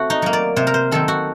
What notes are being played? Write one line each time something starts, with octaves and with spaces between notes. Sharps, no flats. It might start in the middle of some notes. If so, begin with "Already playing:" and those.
Already playing: A3 C4 F#4
D#4
F#3 A#3
D5
C3 C5
A#4
C5
D#3 F#3 C4 A4
F#4